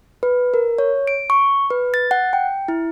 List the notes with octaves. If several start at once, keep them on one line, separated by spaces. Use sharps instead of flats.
B4
A#4
C#5
D7
C#6
B4
A6
F#5
G5
E4